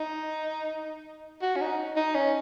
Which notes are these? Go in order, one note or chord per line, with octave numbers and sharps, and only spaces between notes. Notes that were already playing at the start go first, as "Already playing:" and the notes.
Already playing: D#4
F#4
C#4
D#4
D#4
C#4